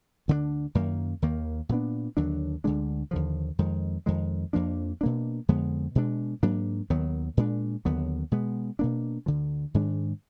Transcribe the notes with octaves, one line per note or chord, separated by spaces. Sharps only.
D2 D3 G#3 D4
F#2 D#3 A#3
D#2 D#3 A#3
A#2 F#3 B3 D4
D#2 D3 F#3 D4
D2 D3 G#3 D4
D#2 D3 F3
F2 D#3 G#3
F2 D#3 G#3
F2 F3 A#3 D4
B2 A#3 D4
F2 D3 G#3 B3
B2 G#3 D4
G#2 F#3 A#3 D4
D#2 D#3 F#3 B3
A#2 G#3 D4
D#2 D3 F#3 B3
B2 G#3 B3
B2 A#3 D4
D2 D3 F3
G#2 D#3 G#3 D4